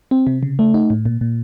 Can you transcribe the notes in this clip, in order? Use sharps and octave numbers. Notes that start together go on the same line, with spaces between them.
C4
C3
C#3
A3
D#4
A2
A#2
A#2